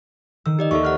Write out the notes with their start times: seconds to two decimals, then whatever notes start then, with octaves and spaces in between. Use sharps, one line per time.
0.46 D#3 E6
0.59 G4 D5 D#5
0.71 D#2 A4 E5 C#6
0.83 F#5 F6 F#6